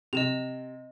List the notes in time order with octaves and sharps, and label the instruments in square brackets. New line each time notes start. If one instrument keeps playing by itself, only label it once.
[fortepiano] C3 [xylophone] D#5 E7 F7